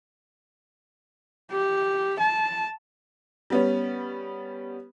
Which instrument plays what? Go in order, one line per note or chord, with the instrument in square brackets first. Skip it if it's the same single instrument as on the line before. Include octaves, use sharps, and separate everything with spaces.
[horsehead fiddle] G4
A5
[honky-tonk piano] G3 B3 C#4